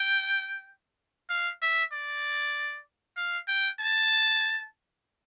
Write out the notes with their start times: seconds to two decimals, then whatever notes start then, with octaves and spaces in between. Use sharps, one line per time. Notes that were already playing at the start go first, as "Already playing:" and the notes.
Already playing: G5
1.30 F5
1.62 E5
1.93 D5
3.17 F5
3.48 G5
3.79 A5